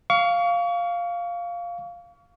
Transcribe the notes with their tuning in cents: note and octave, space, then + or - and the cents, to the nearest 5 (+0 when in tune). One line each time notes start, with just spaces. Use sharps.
F5 +0 C#6 +35